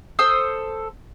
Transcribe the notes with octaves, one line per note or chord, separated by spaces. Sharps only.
A4 C5 D#6 E6